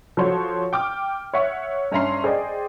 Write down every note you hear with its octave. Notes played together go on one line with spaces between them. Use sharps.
F3 F#4 A4 C5 C#5
G5 D6 F6
C#5 E5 F#5 C#6
G2 C#4 E5 A#5 C6 C7
G#4 C5 D5 D#5 G5